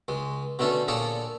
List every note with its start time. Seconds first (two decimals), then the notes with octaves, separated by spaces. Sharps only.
0.08 C#2 G#3
0.59 B2 D3 A3 C#4 D4 A4
0.88 A#2 A#3 G#4 A4 C#5 D5